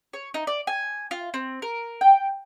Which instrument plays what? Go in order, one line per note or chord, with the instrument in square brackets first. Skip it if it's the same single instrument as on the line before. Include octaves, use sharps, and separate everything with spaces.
[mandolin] C#5
D#4
D5
G#5
F4
C4
A#4
G5